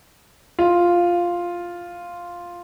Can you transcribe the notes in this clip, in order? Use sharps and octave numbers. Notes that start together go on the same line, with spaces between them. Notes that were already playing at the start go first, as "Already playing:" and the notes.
F4